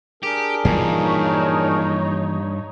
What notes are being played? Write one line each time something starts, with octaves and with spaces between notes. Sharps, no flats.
D4 G4 G#4 A#4
G2 A#2 E3 F3 D#4 C#5